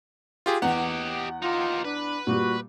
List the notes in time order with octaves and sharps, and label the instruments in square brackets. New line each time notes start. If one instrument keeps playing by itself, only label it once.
[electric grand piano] F4 G4 G#4
[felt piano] E2 [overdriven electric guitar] G4 D#5 [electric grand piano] F#5
[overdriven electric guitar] D#4 G4 [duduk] F4
[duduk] D4 [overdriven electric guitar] B4
[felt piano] A#2 G3 [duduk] F#4